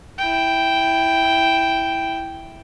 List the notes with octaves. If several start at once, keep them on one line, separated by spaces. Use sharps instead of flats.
E4 G5